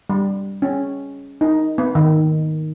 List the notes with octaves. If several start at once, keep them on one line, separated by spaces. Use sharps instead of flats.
G3
C#4
D#4
B3
D#3